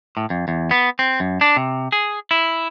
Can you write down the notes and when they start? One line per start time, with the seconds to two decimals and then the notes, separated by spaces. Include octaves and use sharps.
0.17 A2
0.30 F2
0.48 E2
0.71 B3
0.99 C4
1.20 F#2
1.41 D4
1.56 C3
1.92 G#4
2.31 E4